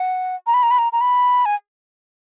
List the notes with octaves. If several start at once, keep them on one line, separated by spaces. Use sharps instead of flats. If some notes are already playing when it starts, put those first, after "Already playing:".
Already playing: F#5
A#5
B5
A#5
B5
A#5
A#5
B5
G#5